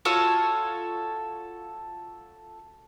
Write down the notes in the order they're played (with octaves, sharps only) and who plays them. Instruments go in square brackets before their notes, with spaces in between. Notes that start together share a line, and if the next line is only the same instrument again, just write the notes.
[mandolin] F4 F#4 A4 C#5